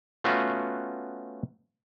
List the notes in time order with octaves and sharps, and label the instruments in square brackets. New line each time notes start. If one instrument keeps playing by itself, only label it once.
[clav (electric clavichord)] A3 B3 C#4 F4 F#4 F#5